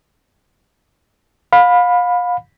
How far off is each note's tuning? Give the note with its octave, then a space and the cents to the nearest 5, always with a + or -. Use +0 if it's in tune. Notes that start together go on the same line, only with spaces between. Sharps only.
F5 +30 B5 +0